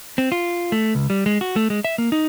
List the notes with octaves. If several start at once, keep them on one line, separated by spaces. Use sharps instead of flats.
C4
F4
A3
C#2
G3
G#3
F#4
A3
G#3
E5
A#3
D#4